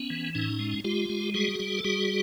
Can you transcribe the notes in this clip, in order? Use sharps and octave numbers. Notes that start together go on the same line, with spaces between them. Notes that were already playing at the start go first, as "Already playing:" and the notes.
Already playing: B3 C#4
E3
A2 C#4 D#4
G#3
G#3 F4 G4
G#3
G3 F#4 G#4
G3
A4
G3 F#4 G#4